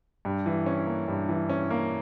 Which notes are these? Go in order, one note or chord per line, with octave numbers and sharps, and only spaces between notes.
G2
E3
C#4
A#3
G2
E3
C#4
A#3